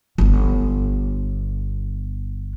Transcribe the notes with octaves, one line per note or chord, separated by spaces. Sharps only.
G1 B3